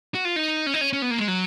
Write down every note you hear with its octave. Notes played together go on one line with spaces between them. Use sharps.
F#4
F4
D#4
C#4
D#4
C#4
C#4
B3
A#3
G#3
F#3